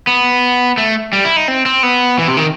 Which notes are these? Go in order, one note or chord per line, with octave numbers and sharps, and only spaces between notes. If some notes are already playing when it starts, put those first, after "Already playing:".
B3
A3
G3
E4
D#4
C4
C4
B3
E3
C3
D#3